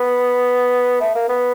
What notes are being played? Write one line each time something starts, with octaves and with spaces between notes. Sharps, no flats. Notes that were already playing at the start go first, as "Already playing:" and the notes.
Already playing: B3
A3
A#3
B3